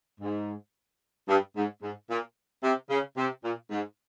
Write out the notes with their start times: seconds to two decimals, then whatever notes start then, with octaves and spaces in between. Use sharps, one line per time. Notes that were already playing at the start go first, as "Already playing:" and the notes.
0.20 G#2
1.28 G2
1.56 G#2
1.82 G#2
2.09 A#2
2.63 C3
2.90 C#3
3.17 C3
3.43 A#2
3.71 G#2